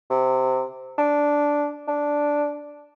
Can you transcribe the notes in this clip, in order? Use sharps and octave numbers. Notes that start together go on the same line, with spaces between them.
C3
D4
D4